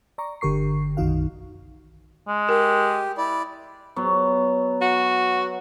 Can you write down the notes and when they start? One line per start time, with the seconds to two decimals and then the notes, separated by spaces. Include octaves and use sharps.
0.18 D5 A#5 C#6
0.41 G1 D3 G4 A#4 C#6 C7
0.97 B1 F#2 D#3 D#4 F#4 F5
2.28 G#3
2.49 G4 A#4
3.18 E4 D5
3.96 F#3 B3
4.82 F#4